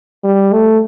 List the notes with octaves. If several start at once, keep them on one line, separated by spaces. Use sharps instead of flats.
G3
A3